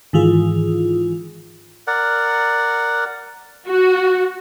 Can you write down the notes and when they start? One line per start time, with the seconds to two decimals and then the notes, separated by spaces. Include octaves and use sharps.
0.13 G#2 D#3 E3 F4 G#4
1.87 A#4 D5 F#5
3.67 F#4